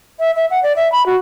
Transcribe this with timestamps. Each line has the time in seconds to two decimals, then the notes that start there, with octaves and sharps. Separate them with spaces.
0.19 E5
0.36 E5
0.51 F#5
0.63 D5
0.76 E5
0.92 B5
1.06 F#4